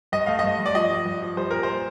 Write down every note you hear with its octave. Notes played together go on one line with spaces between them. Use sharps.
G2 D#5
A3 F5
G2 D#5
G2
D5
F3 D#5
F3
G2
F3
G3 C5
A#2 A#4
C5
A#2